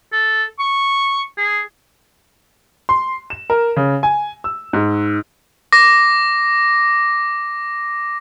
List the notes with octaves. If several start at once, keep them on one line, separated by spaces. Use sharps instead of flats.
A4
C#6
G#4
C6
E7
A#4
C#3
G#5
E6
G#2
D6 A#6